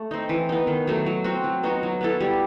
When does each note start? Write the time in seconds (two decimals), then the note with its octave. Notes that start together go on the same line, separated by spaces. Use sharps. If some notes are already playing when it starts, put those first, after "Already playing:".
Already playing: A3 A4
0.11 C4 D#4
0.29 E3
0.49 B3 D#4
0.67 D#3
0.87 F#3 A3 D#4
1.06 F#3
1.24 C4 F#4
1.44 F#3
1.63 B3 D#4 F#4
1.83 F#3
2.01 B3 E4 A4
2.20 G3